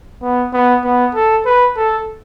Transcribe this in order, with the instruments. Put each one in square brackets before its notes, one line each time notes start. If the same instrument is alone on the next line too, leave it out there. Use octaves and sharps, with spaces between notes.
[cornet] B3
B3
B3
A4
B4
A4